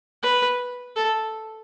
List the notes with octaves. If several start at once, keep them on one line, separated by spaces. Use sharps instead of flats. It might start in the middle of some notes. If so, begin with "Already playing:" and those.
B4
A4